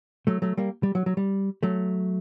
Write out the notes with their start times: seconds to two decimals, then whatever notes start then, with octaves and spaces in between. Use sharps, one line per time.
0.27 F#3 A3
0.42 F#3 A3
0.57 G3 A#3
0.83 G3
0.95 F#3
1.06 F#3
1.17 G3
1.63 F#3 A3